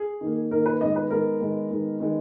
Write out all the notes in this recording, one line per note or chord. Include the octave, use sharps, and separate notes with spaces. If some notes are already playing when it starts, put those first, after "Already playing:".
Already playing: G#4
D#3 A#3
D#3 A#3 A#4
B4
D#3 G#3 B3 D#5
B4
D#3 G#3 B3 A#4
D#3 G#3 B3
D#3 G#3 B3
D#3 G#3 B3